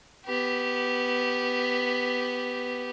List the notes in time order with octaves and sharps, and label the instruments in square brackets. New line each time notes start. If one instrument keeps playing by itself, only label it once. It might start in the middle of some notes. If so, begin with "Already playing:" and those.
[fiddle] B3 G4